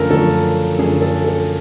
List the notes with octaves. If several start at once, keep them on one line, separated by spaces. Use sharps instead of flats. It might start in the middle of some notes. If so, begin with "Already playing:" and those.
Already playing: F#2 D3 F3 A3 C#4 A4 A#4
F#2 D3 F3 A3 C#4 A4
F#2 D3 F3 A3 C#4 G#4
A4
A4